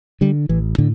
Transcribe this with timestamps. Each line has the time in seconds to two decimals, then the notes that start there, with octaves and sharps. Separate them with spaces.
0.21 D3 G3
0.49 A1 E3
0.78 A2 D3